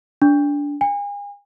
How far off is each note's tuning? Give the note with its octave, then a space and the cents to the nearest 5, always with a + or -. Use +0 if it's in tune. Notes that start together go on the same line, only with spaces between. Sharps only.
D4 -20
G#5 -40